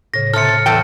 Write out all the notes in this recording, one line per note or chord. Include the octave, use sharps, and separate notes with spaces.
A2 C#3 A#6
C3 A4 F6 C#7
E2 A4 G5 A5